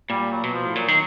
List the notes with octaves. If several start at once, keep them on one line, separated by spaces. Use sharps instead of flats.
A#2 G3
F#3
B2
F3
A2
A#2 F#3
D#3